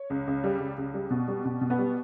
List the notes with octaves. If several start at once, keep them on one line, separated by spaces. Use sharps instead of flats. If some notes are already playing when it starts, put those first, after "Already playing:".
Already playing: C#5
C#2
C#2
G3
C#2
C#2
G3
B2
G3
B2
B2
B3
G3